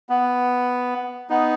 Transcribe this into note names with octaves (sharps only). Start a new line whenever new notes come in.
B3
B3 D#4